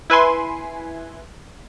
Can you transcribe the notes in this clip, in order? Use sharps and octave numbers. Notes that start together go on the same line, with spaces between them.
E4 B4 G#5 C6